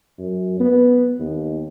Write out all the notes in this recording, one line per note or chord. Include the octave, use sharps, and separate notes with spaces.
F#2
B3
D#2